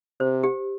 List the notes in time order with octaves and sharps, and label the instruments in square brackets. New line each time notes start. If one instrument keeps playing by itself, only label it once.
[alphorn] C3 [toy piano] C5
[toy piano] G4